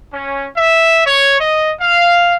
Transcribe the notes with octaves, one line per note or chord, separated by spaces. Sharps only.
C#4
E5
C#5
D#5
F5